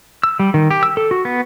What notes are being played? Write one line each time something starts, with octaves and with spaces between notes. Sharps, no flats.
E6
G3
D#3
G4
E6
A4
F#4
B3